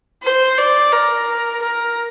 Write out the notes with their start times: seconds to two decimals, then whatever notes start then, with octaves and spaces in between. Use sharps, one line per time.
0.23 C5
0.58 D5
0.93 A#4
1.62 A#4